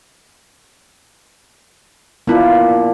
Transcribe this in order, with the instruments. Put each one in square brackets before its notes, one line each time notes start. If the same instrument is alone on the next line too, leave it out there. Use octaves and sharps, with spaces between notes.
[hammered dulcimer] A#2 D4 B5 [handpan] B3 E4 F4